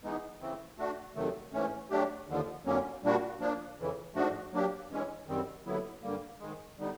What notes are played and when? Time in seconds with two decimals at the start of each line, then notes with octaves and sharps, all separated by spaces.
0.03 E3 G#3 B3 D#4
0.40 C#3 E3 A3 C4
0.78 A3 D4 F#4
1.15 F2 C3 D#3 F#3 A3
1.53 G#2 E3 A3 C#4
1.90 F#3 A3 D4 G4
2.27 D#2 D3 F3
2.65 F2 D3 F#3 A#3 C#4
3.03 A#2 G3 A#3 D4 F#4
3.40 F3 A#3 D4
3.78 F2 C#3 E3
4.15 G#2 F3 A3 D4 F#4
4.52 F#3 A#3 D4 G4
4.90 G2 E3 G#3 C#4
5.27 F#2 D#3 G3 C4
5.65 D#2 D3 F#3 B3 E4
6.02 G2 D3 G3 A#3
6.39 G#2 D#3 G#3
6.78 D3 G3 B3 D#4